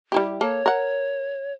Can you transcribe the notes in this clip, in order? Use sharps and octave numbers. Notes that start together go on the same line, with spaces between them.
G3 E4 G4
A#3 A4 C#5
A#4 F#5